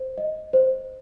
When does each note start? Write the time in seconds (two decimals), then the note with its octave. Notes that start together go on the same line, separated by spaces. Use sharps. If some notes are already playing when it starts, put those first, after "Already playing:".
Already playing: C5
0.18 D#5
0.53 C5